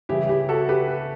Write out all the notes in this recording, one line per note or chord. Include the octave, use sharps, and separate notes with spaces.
C#3 E3 G3 E4 G4
E4 G4
F#4 A4
G4 B4